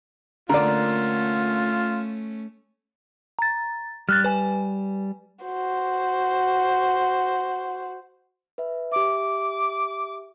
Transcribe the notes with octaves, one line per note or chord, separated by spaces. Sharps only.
D3 A3 A#3 C#4 F4 A#4 D5
A#5 A6
G3 F6 F#6 A6
B4 G#5
F#4 C5
B4 E5
G4 E5 D6